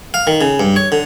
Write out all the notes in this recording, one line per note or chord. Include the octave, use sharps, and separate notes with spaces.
F5
D#3
C#3
G2
C#5
D3